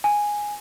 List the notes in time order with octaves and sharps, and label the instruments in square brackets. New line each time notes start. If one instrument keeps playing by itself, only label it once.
[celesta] G#5